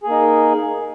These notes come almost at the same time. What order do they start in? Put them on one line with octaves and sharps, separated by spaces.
G#4 A#3 D#4